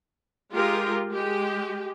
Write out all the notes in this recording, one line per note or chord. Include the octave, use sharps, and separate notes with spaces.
G#3 F4 G4 A#4
G#3 G4